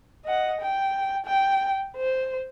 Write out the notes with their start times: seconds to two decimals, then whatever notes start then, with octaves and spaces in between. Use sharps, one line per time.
0.25 D#5 F#5
0.61 G5
1.26 G5
1.97 C5